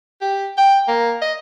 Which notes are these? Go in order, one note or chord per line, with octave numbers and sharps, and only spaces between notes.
G4
G5
A#3
D#5